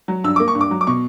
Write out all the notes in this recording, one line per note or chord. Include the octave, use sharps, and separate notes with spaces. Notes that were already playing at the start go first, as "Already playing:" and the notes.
F#3
G2 E6
A#3 D6
C#6
G2
D6
F#3
D6
B2 C#6